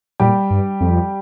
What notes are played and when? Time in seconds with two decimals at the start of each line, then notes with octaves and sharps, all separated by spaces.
0.20 A#2 G3 G4
0.50 G2
0.80 F2